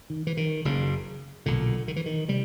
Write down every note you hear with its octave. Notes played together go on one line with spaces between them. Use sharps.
D#3
E3
D#3
F#1 F#2 C#3
B1 A#2 D3
D#3
E3
D#3
C3 G3